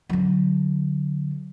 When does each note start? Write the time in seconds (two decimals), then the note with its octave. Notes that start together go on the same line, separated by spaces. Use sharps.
0.09 D3 F#3